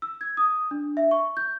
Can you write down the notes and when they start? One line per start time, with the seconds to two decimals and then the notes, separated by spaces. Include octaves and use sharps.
0.02 E6
0.21 G#6
0.37 D#6
0.71 D4
0.97 E5
1.11 C#6
1.37 G6